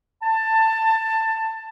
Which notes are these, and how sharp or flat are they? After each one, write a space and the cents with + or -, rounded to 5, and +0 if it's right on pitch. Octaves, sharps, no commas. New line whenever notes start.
A5 +15